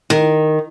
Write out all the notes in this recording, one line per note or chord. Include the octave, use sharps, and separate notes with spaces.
D#3